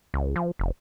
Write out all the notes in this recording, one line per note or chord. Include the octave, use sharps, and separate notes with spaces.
C#2
F3
F1